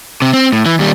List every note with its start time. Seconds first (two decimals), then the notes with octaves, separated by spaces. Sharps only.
0.22 C3
0.33 C4
0.53 A2
0.66 E3
0.79 D#2 G3